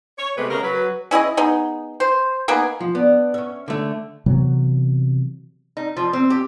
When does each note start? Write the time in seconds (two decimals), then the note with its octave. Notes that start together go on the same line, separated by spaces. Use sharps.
0.18 C#5
0.37 C3 G#3 A3 B3 B4
0.50 C#3 A#4
0.63 F#3 B4
1.11 C#4 E4 G#4 D#5
1.37 B3 D#4 G#4
2.00 C5
2.48 A#3 B3 D#4 G#4
2.81 F3
2.95 B3 D4
3.34 C#4 E5
3.68 D3 A3
4.26 C3 E3 F#3 B3
5.77 D#4
5.97 F3
6.13 C4
6.30 G4